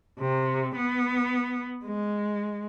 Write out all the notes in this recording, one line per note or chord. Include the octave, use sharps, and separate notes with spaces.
C3
B3
G#3